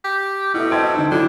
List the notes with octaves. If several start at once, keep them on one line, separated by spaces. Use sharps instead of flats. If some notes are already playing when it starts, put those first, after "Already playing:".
G4
B2 E4 A4 E5
C4 A4 C5 D#5 G#6 D7
D3 D#4
D3 F#3 E4